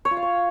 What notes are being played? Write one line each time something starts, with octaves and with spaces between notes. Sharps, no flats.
C#5
F4
F5
C#5